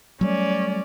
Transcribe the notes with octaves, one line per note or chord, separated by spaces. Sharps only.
F#3 G3 A3 C#4 D5